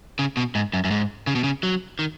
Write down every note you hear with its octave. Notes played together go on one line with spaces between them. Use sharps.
C#3
B2
G#2
F#2
F#2
G#2
C#3
B2
C#3
F#3
D#3